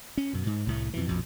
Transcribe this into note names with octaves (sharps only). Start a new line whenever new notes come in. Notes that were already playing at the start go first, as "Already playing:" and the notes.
C#4
F#2 B2
G#2
C2 A2 A3
F2 B2 E3
A#1 F2 B2